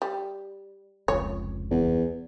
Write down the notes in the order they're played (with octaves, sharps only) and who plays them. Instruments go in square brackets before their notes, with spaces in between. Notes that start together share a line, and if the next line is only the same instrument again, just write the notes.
[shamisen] G3
[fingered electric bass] F1 C#2 [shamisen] C#5
[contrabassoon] E2